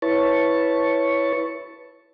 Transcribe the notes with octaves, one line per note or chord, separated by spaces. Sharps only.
E4 B4 C#5 A5 C#6